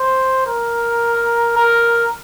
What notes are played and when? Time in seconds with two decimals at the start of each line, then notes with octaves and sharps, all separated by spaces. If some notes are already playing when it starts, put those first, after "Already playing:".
Already playing: C5
0.46 A#4
1.57 A#4